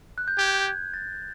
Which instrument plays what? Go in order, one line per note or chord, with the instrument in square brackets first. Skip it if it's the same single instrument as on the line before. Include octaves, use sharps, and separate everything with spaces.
[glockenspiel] F#6
G6
[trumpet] G4 [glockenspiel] G#6
[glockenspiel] A6